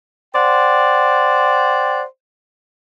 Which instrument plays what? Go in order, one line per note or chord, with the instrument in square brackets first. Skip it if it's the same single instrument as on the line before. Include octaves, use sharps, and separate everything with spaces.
[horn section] C5 D5 F#5 G5